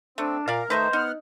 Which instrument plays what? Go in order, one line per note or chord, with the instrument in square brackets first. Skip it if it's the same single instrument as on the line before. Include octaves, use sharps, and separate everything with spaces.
[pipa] A3 [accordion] C4 [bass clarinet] D4
[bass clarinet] A#2 [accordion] A#4 [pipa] D5 E5 F5
[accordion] D#3 A3 D#4 [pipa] B4 D#5 E5 [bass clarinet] C5
[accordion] B3 F#5 F6 [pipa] D#4